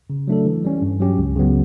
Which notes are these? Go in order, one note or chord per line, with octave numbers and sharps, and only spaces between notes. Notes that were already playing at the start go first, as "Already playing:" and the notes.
C#3
F#3 A3 D4 A4
E3
G3 C#4
G2
F#3 C#4 G4
C#2
C#3 F#3 B3